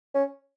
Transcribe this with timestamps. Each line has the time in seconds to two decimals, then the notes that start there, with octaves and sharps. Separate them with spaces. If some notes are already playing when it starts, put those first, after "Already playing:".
0.15 C#4